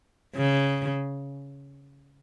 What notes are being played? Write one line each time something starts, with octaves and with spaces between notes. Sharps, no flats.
C#3